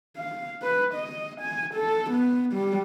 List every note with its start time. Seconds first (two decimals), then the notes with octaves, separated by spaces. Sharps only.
0.18 F5
0.63 B4
0.95 D#5
1.41 G#5
1.75 A4
2.11 B3
2.53 G3